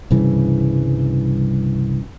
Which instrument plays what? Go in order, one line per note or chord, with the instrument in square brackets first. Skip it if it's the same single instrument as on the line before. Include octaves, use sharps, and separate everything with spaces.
[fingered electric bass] C2 G2 C#3 E3